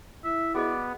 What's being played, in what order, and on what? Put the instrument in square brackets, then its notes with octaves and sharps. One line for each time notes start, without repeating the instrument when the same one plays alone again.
[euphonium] E4 [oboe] E5
[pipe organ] B3 [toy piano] F#4 G#4 D#5 [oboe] D5